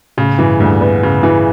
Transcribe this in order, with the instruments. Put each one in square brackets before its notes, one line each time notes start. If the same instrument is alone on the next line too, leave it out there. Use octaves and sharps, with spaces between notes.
[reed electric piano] A2 [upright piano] C#3
[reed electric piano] G2 [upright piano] E3
[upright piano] D2 [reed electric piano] G2
[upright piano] B3
C#3
E3